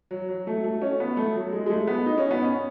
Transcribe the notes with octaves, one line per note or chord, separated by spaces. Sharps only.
F#3
F#3
A3
A3
C#4
B3
A3
F#3
G#3
G#3
A3
B3
D#4
C#4
B3
C#4